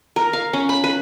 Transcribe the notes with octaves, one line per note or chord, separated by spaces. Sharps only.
A#4
F5
C#4
B5
B4